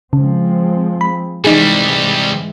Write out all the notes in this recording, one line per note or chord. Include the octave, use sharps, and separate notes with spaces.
C#3 F3 G#3 C4
B5
C2 G#2 E3 G3 G#3 D#4 G#4